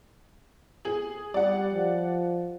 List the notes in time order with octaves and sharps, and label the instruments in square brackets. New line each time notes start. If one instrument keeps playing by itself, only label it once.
[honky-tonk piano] G#4 F#7
[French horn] G3 [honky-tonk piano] D5 F#5
[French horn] F3